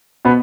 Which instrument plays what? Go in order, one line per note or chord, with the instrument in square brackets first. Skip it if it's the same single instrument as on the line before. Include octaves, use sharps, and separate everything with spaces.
[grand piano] B2 B3